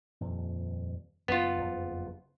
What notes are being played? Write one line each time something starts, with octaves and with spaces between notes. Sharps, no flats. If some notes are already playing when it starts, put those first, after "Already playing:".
D#1 F2
F#1 D#3 B3 C#4 F4
F#1 F2